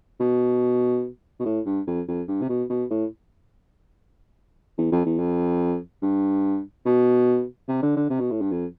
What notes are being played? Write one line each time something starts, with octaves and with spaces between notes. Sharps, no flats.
B2
B2
A2
G2
F2
F2
G2
C3
B2
B2
A2
E2
F2
E2
F2
G2
B2
C3
D3
D3
C3
B2
A2
G2
F2